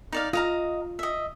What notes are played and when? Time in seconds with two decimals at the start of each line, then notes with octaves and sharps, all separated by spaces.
0.12 D#4 D5 F5
0.33 F4 D#5 F5 A#5
0.99 D#5 E5